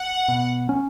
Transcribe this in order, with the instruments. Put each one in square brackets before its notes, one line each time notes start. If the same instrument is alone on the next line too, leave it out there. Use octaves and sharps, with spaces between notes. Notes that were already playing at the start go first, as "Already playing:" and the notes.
Already playing: [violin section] F#5
[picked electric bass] B2
C#4